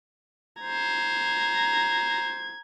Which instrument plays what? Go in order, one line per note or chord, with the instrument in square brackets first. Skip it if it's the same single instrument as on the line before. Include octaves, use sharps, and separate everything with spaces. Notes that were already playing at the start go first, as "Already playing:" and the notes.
[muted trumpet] C5 [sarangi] A#5 [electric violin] G#6